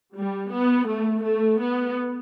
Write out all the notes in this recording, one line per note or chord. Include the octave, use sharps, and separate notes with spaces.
G3
B3
A3
A3
B3